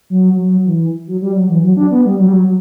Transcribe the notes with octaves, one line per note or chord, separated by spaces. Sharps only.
F#3
F#3
E3
F#3
G3
F#3
E3
F#3
D4
B3
G3
F#3
G3
F#3